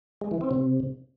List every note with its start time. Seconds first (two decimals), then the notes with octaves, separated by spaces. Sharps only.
0.21 G#3
0.31 E3
0.41 C4
0.51 C3